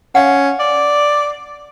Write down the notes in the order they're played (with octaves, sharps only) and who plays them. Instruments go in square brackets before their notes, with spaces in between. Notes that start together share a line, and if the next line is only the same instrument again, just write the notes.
[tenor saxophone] C#4 [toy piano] F5 F#5
[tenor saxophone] D5